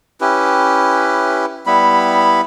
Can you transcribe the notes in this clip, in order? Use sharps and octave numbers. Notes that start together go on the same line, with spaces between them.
C#4 E4 G4 B4
G3 B3 E4 B5